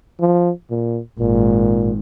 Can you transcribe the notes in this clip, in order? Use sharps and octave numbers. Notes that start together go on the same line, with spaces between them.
F3
A#2
G#1 A#2